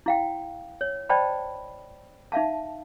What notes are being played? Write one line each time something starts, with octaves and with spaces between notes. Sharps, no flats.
E4 F5 G5
C#5
C5 D5 D#5 G5 A5 B5
D#4 E5 F5 A5